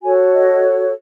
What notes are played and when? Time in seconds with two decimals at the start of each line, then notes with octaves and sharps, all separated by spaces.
0.03 F#4 A4 C#5 G#5
0.34 D#5